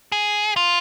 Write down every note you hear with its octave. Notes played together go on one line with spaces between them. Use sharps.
G#4
F4